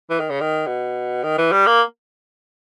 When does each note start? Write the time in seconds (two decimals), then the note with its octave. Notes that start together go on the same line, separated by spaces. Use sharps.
0.10 E3
0.20 D#3
0.30 C#3
0.41 D#3
0.66 B2
1.23 D#3
1.38 E3
1.52 G3
1.66 A#3